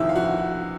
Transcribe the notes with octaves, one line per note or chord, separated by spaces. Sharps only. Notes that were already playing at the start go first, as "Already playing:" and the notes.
Already playing: F2 C3 D#3 E4 E5
F5
F#4 F#5